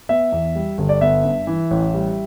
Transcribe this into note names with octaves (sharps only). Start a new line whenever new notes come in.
B3 E5
E2
G3
G1
D5
B3 E5
G2
E3
A1
G3